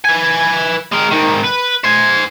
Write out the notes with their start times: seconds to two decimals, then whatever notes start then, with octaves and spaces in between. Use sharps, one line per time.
0.05 B4 G#5
0.92 G#3 A#4
1.11 G#2 D#3
1.44 B4
1.84 C5 G#5